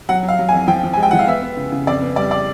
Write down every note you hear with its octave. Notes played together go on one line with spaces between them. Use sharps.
F#3 F#5
F#3
F5
F#3
G#5
F2
F3 G5
F3
G#5
G#3
G5
F3 F#5
F5
B3 E5
B3
C#3
C#3
F2 D5
B3
G3 D5
D5